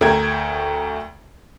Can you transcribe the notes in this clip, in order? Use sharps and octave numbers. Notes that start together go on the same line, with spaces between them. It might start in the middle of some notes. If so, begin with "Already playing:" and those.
D2 A3 A#4 G5 G#6